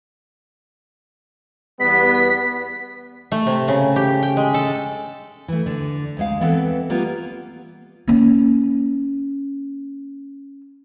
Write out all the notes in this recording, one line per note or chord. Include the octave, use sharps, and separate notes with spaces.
E2 G3 B3 B6
A3
C3
C#3
G4
G5
G#3
A4
E3 A3
D3
D2 G#3 F5
E3 B3 C4 A4
G3 A#3 B3 F4
A#3 C#4